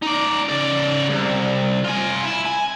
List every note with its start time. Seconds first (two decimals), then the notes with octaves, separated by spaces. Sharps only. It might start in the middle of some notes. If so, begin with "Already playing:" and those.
0.02 D#4 D5
0.49 C#3 D5
1.09 C2
1.84 F4 G#5
2.25 E4
2.45 G#5